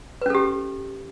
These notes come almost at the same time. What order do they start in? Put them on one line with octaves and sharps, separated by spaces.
B4 C#4 A4 G4